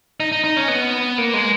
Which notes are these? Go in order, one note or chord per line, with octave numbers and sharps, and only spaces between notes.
D#4
D#4
D#4
C#4
B3
A#3
G#3